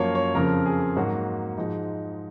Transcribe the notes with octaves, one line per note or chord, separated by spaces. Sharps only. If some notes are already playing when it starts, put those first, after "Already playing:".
Already playing: F#2 F3 A#3 C#5 F5
C#5
F2 C#3 F3 A#4
G#4
G#2 F#3 A#3 F#4
G#2 F3 G#3 D#4